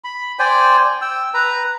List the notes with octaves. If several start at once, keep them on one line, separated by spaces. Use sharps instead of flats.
B5
C5 D5 G5 G#5
G5 E6
B4 A#5